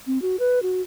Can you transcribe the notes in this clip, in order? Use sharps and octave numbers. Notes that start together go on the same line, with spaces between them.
C4
F#4
B4
F#4